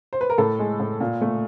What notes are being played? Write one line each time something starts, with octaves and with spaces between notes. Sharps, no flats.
C5
B4
A#4
A2 A4
G#3
A2
A#2
A3